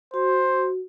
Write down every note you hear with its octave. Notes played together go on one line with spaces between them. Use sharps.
F#4 C5